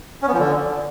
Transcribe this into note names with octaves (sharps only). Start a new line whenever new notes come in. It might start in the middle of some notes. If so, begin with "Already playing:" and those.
C#4
B3
F3
D3